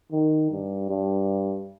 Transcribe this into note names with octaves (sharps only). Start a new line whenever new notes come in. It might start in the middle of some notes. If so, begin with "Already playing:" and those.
D#3
G2
G2